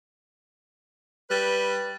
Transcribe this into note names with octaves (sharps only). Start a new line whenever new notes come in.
G3 B4